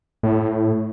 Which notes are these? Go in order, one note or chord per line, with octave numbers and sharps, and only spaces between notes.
A2